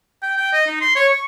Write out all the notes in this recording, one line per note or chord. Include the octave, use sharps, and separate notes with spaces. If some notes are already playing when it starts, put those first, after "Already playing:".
G5
G5
D#5
D#4
C6
C#5
C#6